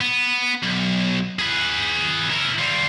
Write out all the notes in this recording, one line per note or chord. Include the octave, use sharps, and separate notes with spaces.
B3
B1
G#4 B4
E4 A#4
G3 F4